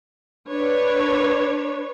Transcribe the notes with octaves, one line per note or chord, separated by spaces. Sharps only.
D4 B4 C#5